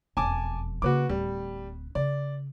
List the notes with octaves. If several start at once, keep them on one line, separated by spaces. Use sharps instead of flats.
E1 F2 G#5 A5 D6
C#3 A#3 F#4 B4 D6
D1 G3
C#3 D5